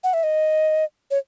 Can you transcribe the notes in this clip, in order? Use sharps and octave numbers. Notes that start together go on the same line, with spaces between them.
F#5
E5
D#5
C#5